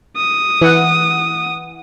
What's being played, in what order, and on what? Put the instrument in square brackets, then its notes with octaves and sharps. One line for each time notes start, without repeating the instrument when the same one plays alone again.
[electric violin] D#6
[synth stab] E3 F#5